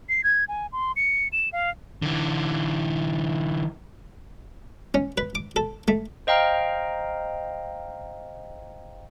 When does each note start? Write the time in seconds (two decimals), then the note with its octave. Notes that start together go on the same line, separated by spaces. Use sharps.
0.09 C7
0.24 G#6
0.48 G#5
0.73 C6
0.96 C#7
1.33 E7
1.53 F5
2.02 D3 E3
4.94 C#4
5.18 B4
5.35 D6
5.56 A4
5.88 A3
6.27 C5 D#5 F5 G5 A#5 F6